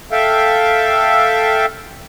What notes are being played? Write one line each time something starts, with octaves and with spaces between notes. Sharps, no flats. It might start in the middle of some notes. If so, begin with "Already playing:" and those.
A4 E5 F5 G5